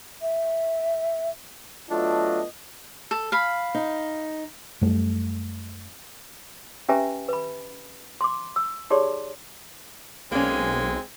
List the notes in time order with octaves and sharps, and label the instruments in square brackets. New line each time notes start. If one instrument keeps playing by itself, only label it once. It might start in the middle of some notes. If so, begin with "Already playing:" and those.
[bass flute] E5
[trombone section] F#3 A3 D4 [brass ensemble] B3 F4 D#5
[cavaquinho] A4
F5 B5
[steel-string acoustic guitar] D#4
[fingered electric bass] F#2 G3 A3
[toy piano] C#4 G4 B4 E5 G#5 A#5
B4 B5
C6 D6
E6
D#4 G4 G#4 C#5 D5 C6
[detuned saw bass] B1 [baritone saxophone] G#3 [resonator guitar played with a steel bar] A#3 C#4 [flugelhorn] C4